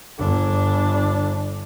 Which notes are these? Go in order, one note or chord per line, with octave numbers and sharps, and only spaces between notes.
G1 D4